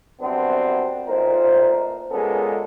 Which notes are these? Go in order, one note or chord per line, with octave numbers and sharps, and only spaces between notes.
C2 F#2 B3 C4 D4
A1 A#2 D#4 A#4 C5
A#2 G#3 A#3 B3 C#4 A4